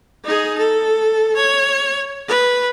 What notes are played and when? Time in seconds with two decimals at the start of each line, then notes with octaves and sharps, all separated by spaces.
0.24 D#4 G#4
0.58 A4
1.36 C#5
2.28 B4